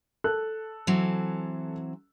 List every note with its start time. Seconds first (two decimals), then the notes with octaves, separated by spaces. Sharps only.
0.24 A4 F#6
0.87 E3 F#3 C4